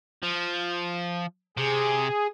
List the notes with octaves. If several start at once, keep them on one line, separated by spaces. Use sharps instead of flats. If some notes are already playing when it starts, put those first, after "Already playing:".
F3
C3 G#4